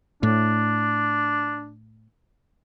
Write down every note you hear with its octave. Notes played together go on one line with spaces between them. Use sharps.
A2 D4